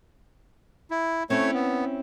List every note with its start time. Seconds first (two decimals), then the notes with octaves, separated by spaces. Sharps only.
0.91 E4
1.30 A3 C4 C#4 E4 C#5
1.53 B3